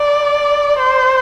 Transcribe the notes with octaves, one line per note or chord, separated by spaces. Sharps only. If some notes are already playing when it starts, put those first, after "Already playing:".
Already playing: D5
C5